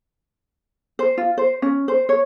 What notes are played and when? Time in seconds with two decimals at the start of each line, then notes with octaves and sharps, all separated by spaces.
0.99 C5
1.18 F4
1.38 C5
1.62 C#4
1.88 C5
2.09 C#5